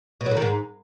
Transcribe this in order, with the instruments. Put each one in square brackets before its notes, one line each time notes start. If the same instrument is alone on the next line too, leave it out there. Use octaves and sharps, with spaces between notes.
[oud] B2
F#3
A2
D#3
G#2